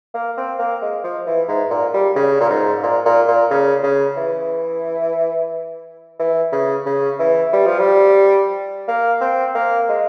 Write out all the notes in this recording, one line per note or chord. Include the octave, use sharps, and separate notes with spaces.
A#3
C4
A#3
G#3
F3
E3
G#2
A#2
G3
C#3
A#2
G#2
A#2
A#2
A#2
C#3
C#3
E3
E3
C#3
C#3
E3
G3
F3
G3
A#3
C4
A#3
G#3